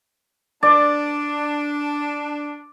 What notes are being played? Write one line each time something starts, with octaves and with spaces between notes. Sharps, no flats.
D4 D5